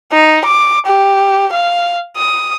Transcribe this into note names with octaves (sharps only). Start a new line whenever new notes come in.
D#4
D6
G4
F5
D#6